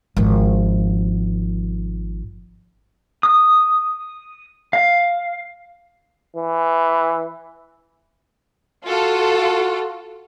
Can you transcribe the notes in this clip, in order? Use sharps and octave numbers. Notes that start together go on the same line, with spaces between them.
G#1 F3
D#6
F5
E3
F4 F#4 A4